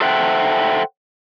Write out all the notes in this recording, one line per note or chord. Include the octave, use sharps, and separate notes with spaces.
A4 C5 E5 F#5 G5